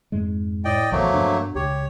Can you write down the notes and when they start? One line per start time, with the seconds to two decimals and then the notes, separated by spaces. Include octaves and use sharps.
0.12 F2 G#2 G#3
0.65 A2 D5 D#5 G5
0.92 A#1 E2 B2 F3 F#3 A3 A#3
1.14 G2 B2 D4
1.55 C#2 G4 C#5